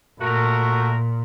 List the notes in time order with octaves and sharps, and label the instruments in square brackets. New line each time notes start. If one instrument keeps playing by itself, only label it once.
[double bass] A#2 [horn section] A3 F#4 A#4